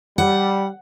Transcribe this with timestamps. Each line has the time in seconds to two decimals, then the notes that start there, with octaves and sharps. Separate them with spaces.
0.18 G3 F#5